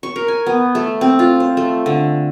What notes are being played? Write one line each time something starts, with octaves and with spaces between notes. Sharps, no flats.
C#6
A#4
G#5
B3
A3
C4
F4
C5
A3
D3